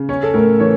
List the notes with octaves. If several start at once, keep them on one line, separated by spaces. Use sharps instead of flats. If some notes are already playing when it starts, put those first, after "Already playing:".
Already playing: C#3
C#4 C#5
A4
A2 A#4
E3 C#5